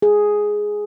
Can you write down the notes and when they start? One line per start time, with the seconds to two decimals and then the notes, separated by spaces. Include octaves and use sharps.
0.02 G#4